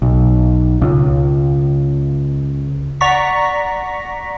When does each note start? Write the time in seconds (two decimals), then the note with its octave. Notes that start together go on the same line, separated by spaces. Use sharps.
0.02 B1
0.82 C#2
3.01 D5 F#5 A#5 C#6 A#6 B6